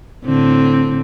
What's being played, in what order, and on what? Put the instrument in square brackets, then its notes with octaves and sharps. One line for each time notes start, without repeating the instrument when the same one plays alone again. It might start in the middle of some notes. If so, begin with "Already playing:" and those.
[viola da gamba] A2 D3 C4